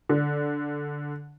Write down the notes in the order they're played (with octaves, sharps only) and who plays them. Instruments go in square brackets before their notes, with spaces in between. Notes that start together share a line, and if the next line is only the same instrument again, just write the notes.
[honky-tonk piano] D3